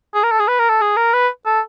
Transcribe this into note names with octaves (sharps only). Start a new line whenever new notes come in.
G#4
A#4
A4
G#4
B4
A#4
A4
G#4
A#4
B4
A4